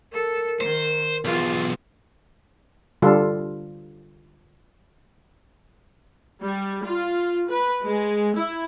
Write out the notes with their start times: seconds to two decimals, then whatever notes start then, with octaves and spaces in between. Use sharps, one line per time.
0.13 A4 A#4
0.61 D#3 C5
1.25 B1 E2 F4
3.02 D3 G3 F4 A4
6.41 G3
6.85 F4
7.49 B4
7.84 G#3
8.36 E4